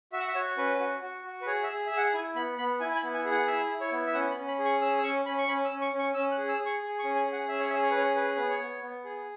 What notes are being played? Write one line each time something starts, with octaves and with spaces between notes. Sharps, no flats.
F#4 E5
F#5
E5
F#4 C#5
C#4 B4
F#4
F#4
F#4
B4
G#4 C#5
E5
G#4
G#4 E5
F#5
E4 G#5
B3 B5
B3 B5
E4 G#5
G#5
B5
B3
G#5
G#4
F#5
E4 E5
E4
C#5
B3
E5
C#4 F#5
B5
C#4
B5
G#4
C#6
C#4 E6
E6
C#4 C#6
C#4 B5
C#6
C#4 B5
E6
C#4
C#6
C#4
C#6
C#4 E6
F#6
G#4
E6
G#4
C#6
G#4
C#6
C#4
G#5
G#4
F#5
C#4 E5
C#5
G#4 E5
C#5
B4
C#4 C#5
G#4 B4
B3 B4
C#5
B3
B3
G#4